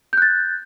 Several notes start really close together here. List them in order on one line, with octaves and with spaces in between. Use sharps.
G6 F#6 A6